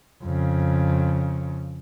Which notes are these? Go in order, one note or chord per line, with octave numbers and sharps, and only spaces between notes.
F2 C#3